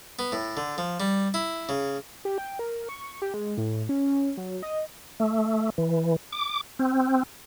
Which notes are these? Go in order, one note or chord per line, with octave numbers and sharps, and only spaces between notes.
B3
A2
D3
F3
G3
E4
C#3
G4
G5
A#4
C#6
G4
G#3
A2
C#4
F#3
D#5
A3
E3
D6
C4